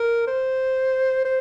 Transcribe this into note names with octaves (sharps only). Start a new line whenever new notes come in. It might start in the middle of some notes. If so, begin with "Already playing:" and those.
Already playing: A#4
C5
C5